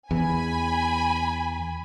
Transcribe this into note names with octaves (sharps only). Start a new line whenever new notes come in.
E2 G#5 B5